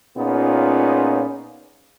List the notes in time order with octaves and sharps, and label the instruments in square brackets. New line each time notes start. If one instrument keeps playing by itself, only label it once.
[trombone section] A#2 B3 C#4 D#4 F4 G#4